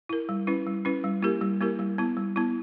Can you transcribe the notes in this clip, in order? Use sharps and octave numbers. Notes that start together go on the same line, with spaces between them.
E4 A#4
G3
C#4 E4 B4
G3
C#4 E4 B4
G3
A#3 E4 G4 A#4
G3
A#3 E4 G4 A#4
G3
B3 E4
G3
B3 E4